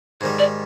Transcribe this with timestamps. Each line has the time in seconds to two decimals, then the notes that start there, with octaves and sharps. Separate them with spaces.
0.21 G#2 D#3 G3 C5
0.39 D5